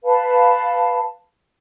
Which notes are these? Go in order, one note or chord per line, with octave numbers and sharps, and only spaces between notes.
B4 F5 A5 B5